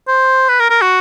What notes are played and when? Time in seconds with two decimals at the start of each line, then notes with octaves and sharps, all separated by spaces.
0.08 C5
0.49 B4
0.60 A#4
0.70 A#4
0.81 F#4